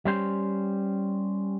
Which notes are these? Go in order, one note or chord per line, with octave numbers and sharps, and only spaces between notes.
G3 C#4 C5